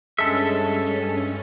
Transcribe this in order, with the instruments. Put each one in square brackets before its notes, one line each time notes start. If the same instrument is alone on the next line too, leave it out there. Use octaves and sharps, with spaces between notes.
[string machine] G2 C#4 [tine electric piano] G#3 [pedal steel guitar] A4 E5